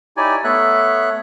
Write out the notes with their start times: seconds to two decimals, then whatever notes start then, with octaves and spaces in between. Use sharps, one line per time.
0.17 D#4 E4 G4 C#5 D5 G#5
0.44 A3 B3 A4 C#5 E5 F#6